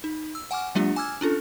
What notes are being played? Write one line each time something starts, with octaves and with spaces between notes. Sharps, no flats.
D#4
E6
F#5 G#5 C#6 D6 F6
F#3 G#3 A#3 D4 F4 G4
G#5 D6 E6 F6 G#6
C#4 D4 F4 A4